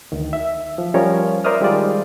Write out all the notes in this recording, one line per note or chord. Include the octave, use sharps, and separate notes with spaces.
D2 D#3
E5
F3
F3 G3 C#4 F4 A#4 C#5
A#4 C5 D5 E5 D#6 F6
D#3 G3 G#3 F4 D5